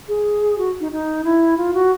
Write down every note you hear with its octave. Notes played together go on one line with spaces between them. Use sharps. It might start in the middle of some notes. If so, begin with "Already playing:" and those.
G#4
F#4
D#4
D#4
E4
F4
F#4